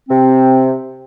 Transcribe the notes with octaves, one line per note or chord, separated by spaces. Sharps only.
C3 C4